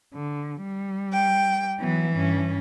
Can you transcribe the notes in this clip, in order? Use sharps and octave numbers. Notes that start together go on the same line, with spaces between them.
D3
G3
G5
E3 F#3 B3
G2 C#4